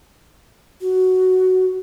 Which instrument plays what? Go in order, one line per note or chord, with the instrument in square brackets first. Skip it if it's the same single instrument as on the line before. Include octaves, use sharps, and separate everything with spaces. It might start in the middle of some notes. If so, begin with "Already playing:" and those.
[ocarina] F#4